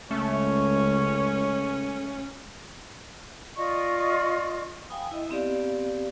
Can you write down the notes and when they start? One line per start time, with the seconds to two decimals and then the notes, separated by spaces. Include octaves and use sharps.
0.11 C#2 A3 C#4 C#5
3.56 F4 D5 D#5 C#6
4.90 F5 G5 G#5 B5 D#6
5.11 E4 D#5 E5
5.30 B3 C4 G4 D5 F5